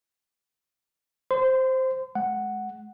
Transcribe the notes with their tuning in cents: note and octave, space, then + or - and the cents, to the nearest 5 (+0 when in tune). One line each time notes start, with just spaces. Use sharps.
C5 +0 C6 -30
G#3 +25 F#5 +0